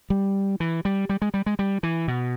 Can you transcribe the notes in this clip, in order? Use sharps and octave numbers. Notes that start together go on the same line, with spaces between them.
G3
E3
G3
G3
G#3
G3
G#3
G3
E3
B2